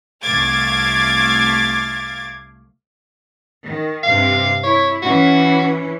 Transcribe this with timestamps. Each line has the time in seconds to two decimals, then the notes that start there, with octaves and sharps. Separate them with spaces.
0.22 C2 A3 F5 D6 G#6 A6
3.65 D#3
4.03 G2 C3 F5
4.63 E4 C#5
5.03 E3 C#4 F#4